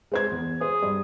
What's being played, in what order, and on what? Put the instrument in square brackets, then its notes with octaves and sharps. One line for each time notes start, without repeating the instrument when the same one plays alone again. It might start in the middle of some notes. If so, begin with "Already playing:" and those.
[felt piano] G#3 C5 G#6
E2
[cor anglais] G#4 [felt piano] C5
[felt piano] G2